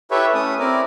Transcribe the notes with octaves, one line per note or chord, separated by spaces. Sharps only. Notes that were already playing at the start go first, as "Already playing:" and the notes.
E4 G4 A4 B4 C#5 E5
A3 C#4 D#6
C4 E4 A#4 D5